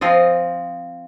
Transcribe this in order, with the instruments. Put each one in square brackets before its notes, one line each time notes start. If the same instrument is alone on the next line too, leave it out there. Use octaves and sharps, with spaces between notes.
[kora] F3 C4 F4 D#5